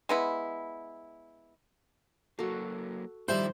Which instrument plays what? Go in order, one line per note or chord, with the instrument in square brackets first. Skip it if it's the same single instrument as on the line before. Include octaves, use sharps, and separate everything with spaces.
[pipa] G#3 B3 E4
[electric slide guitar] F#3 A#3 [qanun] F#4 A4
[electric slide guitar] D#3 F3 [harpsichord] G3 E5 B5 [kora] C5